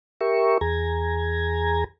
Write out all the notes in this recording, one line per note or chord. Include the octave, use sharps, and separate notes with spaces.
G4 A#4 E5 C#6
E2 G#4 A#5 G#6